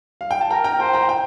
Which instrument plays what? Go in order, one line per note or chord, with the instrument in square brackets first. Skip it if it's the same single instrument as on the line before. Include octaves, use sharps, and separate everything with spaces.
[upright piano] F5
G5
A5
[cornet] A#4 [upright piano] G5 A#5
[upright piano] G5 A#5
[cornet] C5 [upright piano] G5 A#5
[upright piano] G5 A#5
G5